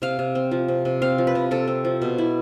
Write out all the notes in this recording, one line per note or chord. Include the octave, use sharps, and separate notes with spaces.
C3 F5
C3
C4
F3
C3
C3
C4 F5
F3
B4
C3
C3 A4
C4
F3
B2
E4